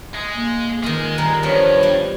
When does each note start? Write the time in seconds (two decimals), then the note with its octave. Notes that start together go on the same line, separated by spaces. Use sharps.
0.15 G#3
0.32 A#3
0.83 D#3 G#3 F4
1.18 D#3 G3 A#5
1.43 G2 F3 B3 C#5
1.83 G3